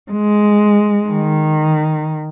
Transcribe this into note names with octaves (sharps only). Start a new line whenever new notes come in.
G#3
D#3